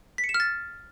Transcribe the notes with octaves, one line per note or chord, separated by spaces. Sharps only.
B6
C#7
E7
F6
A6